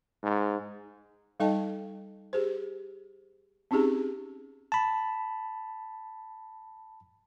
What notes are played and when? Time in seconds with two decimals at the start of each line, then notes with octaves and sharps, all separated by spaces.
0.23 G#2
1.40 G3 D#4 A4 D#5 G5 A5
2.33 G4 G#4 C5
3.71 C4 C#4 D#4 G4 G#4
4.72 A5 B5